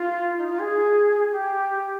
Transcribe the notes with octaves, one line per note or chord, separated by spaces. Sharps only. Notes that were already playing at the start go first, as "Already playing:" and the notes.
Already playing: F4
D#4
F4
G#4
G4